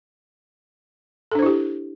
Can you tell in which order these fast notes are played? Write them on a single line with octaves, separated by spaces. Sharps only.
A4 D4 C5 E4 G4